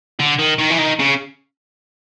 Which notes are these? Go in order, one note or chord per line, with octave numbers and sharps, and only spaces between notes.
D3
D#3
D#3
E3
D#3
C#3